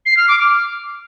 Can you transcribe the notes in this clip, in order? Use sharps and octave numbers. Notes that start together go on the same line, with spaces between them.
C7
F6
D6
F6